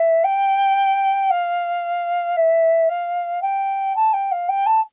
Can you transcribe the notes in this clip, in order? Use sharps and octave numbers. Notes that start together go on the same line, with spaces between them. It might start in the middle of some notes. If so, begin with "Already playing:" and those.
Already playing: E5
G5
F5
E5
F5
G5
A5
G5
F5
G5
A5